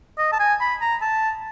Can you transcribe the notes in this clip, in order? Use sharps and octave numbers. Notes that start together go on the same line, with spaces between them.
D#5
A5
G#5
B5
A#5
A5